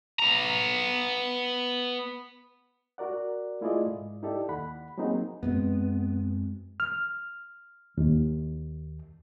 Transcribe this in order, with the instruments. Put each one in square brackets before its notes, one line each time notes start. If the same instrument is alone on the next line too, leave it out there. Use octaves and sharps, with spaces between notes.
[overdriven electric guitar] B3 A#5
[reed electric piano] F#4 A#4 D5 F#5
A3 E4 F4 G#4 D5 D#5
G#2
D#4 E4 G4 A4 D5
D#2 F#5 B5
F#3 A#3 C4 D#4 F#4 G#4
[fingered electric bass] F#2 G#3 C4 [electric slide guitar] B3
[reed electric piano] F6
D#2